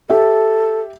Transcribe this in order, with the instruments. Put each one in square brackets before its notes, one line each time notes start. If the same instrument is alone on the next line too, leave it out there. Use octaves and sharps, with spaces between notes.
[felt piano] G4 E5 [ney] A4